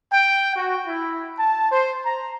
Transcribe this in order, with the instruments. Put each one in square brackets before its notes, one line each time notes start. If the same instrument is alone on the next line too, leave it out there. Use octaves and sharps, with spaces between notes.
[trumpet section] G5
F#4
E4
A5
C5
A#5